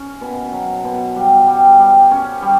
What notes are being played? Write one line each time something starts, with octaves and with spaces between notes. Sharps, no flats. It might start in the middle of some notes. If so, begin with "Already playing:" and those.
Already playing: C#4
B2
F#3
B2
G3
G3
G3
C#4
G3